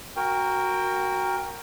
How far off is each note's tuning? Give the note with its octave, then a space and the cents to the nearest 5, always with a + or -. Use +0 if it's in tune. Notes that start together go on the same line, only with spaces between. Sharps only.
F#4 +0 A#4 +0 G5 +25